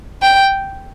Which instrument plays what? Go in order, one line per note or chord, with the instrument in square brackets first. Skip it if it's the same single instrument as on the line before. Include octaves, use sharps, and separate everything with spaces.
[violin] G5